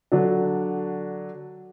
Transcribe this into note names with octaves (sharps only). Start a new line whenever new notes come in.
D3 F#3 D4